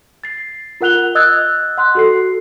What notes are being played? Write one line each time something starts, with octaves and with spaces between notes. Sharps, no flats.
A6 C7
F4 A#4 F#5 F#6 F7 G7
D#5 D#6 E6 F#6 G#6 A6
F#5 C6 F#6
F#4 A4 C7